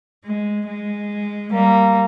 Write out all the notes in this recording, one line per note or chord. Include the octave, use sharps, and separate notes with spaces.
G#3
G#3
G3 A#3